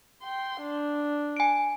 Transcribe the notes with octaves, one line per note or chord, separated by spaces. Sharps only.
G5 C6
D4
G#5 D7